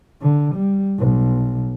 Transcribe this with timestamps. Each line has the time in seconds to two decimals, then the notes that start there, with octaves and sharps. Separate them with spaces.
0.22 D3
0.55 G3
0.98 B1